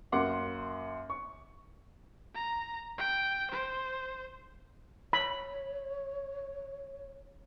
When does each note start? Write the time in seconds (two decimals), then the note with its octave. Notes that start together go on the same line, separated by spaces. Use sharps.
0.12 F#2 A#3 F#5 C6 D6
1.10 C#6
2.35 A#5
2.98 G5
3.52 C5
5.13 C#5 B5